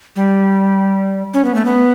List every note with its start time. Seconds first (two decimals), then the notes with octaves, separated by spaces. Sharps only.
0.16 G3
1.34 C#4
1.45 B3
1.55 A3
1.65 B3